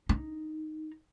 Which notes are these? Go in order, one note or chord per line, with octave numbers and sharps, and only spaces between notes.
D#4